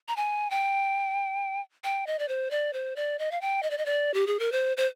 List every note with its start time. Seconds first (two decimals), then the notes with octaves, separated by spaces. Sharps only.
0.08 A#5
0.17 G#5
0.51 G5
1.84 G5
2.07 D#5
2.19 D5
2.28 C5
2.51 D5
2.73 C5
2.96 D5
3.19 D#5
3.31 F5
3.41 G5
3.63 D#5
3.70 D5
3.78 D#5
3.86 D5
4.14 G4
4.27 G#4
4.39 A#4
4.52 C5
4.77 C5